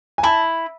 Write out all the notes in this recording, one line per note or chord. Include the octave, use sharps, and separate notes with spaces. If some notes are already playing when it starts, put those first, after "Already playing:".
G#5
E4 A5